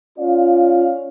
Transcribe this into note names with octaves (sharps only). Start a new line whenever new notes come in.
C#4 F4 D5 F5